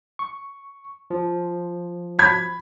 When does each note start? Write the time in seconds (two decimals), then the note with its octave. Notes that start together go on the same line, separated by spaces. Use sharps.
0.19 C#6
1.10 F3
2.19 B5 G#6 B6